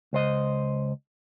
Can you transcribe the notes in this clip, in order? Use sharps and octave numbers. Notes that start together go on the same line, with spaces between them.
C#2 C5 D#5